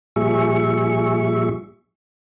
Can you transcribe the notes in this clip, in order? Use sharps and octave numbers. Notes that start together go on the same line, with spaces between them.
A#2 F3 G3 G#4 E5 C#6